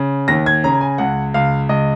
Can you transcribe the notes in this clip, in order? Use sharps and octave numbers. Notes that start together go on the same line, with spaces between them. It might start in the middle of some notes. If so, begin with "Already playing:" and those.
Already playing: C#3
D#2 A#6
G#6
C#3 A#5
G#5
C#2 F#5
C#2 F5
C#2 D#5